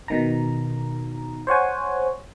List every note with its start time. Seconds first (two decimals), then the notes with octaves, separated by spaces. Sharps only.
0.08 B2 D#3 A#5
1.47 C5 C#5 F#5 G#5